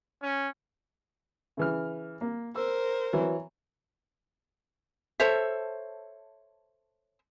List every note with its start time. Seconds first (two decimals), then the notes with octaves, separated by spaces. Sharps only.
0.22 C#4
1.57 C#3 E3 F6
2.21 A#3
2.56 A#4 C5 E6
3.13 E3 F#3
5.20 A4 C5 C#5 E5